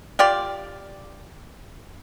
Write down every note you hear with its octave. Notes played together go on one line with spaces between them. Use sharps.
F4 G4 D5